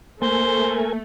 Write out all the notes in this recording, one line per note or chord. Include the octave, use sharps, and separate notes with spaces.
A3 A#3 A#4 C5 G#5